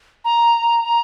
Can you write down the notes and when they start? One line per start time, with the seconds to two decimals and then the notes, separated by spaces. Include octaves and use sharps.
0.25 A#5
0.84 A#5